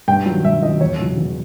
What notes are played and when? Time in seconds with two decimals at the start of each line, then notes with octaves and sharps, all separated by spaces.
0.08 G2 G5
0.26 D#3 F#3
0.44 G2 E5
0.62 D#3 F#3 D#5
0.81 E2 C#5
0.99 C#3 F#3
1.18 E2